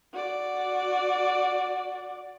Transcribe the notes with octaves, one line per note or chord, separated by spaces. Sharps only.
F#4 D5